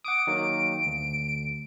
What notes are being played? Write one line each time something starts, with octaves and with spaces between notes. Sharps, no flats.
F#5 D6 D#6 D7
D#3 F#3 A#3
D2